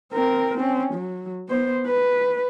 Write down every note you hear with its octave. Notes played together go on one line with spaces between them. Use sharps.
C4 A#4
C4 C#4
F#3
B3 C5
B4